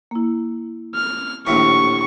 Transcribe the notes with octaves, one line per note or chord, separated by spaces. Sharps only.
A#3 E4
F6
A#1 D#2 A2 C#6